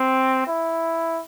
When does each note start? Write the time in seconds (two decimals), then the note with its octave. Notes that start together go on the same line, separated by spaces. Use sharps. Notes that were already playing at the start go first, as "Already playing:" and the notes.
Already playing: C4
0.47 E4